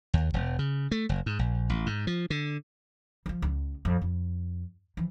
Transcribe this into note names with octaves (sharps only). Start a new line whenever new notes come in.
D#2
E1
C#3
A3
F#1
G#2
A#1
A1
G#2
F3
D3
E3 F3
C#2
F2
F2
E3 F3